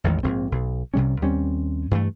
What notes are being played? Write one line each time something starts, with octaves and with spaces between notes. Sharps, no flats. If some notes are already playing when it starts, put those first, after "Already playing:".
A1 E2 D#3 G#3
A#1 G#2 C4
B1
C2 C3 G3 C#4
D#2 G3 C4 C#4
G2 E3 A3